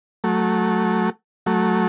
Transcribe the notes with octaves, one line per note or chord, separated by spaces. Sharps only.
F#3 A3
F#3 A3